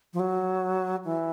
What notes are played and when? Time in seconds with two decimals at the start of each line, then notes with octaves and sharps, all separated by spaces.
0.13 F3
0.20 F#3
1.05 E3